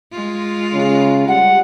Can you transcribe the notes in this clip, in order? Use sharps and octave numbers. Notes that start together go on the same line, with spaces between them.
G#3 F4
C#3
G3 F#5